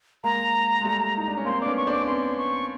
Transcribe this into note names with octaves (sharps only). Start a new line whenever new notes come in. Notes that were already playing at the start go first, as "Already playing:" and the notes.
G#3 A#3 A#5
G#3
G3 A3
D#4
D4
C#4
A#3 C4 C6
B3 C#4 D4 D6
C#6
C4 D4 D6
C4
B3 C#4 C6
C#6